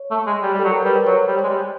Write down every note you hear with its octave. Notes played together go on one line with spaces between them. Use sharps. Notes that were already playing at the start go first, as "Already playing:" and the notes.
Already playing: C#5
A3
G#3
G3
G3
A4
F#3
A#4
G3 B4
C5
F#3 C#5
G3
G#3 C5
G3